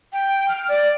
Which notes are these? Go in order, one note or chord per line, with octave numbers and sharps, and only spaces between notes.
G5
F6
D5